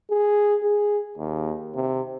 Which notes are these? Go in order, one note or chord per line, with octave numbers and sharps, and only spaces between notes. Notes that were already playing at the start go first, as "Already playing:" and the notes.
G#4
G#4
D#2
C3